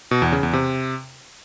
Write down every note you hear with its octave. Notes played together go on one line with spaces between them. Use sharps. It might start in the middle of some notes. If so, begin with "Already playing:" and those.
B2
E2
C#3
E2
C3